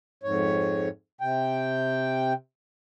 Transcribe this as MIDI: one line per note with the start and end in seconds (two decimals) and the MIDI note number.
0.23 0.89 41
0.23 0.89 44
0.23 0.89 73
1.21 2.33 48
1.21 2.33 79